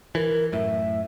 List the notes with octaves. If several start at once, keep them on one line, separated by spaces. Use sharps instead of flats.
E3 A#4
F#2 A2 E5